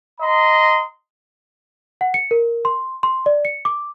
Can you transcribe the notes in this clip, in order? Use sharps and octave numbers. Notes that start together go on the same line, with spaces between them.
D#5 A#5 C6
F#5
C#7
A#4
C6
C6
D5
C#7
D6